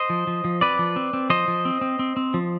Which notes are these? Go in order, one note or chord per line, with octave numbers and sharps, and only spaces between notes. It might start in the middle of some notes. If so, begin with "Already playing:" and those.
Already playing: C5 D#5
F3
F3
F3
C4 B4 D5
F3
C4
C4
F3 C5 D#5
F3
C4
C4
C4
C4
F3